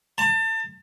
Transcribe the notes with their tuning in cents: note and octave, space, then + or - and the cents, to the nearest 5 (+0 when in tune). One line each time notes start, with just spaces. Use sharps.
A5 +30